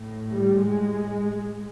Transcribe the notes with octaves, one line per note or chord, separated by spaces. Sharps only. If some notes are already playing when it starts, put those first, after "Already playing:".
Already playing: A2
G3
G#3